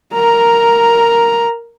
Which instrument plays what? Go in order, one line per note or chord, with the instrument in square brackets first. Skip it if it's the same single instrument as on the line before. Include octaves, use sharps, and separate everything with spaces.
[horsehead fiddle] A#4 A#5